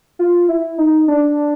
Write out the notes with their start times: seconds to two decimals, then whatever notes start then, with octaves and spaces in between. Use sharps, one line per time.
0.19 F4
0.49 E4
0.78 D#4
1.08 D4